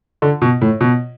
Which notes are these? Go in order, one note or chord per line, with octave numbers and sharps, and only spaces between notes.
D3
B2
A2
B2